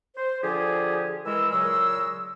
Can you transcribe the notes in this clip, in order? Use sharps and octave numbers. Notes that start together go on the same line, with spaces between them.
C5
D3 F3 F4 G4 G#4
E3 G#3 A#4 E6
A#2 C#3 F#3 G#3 C#6 E6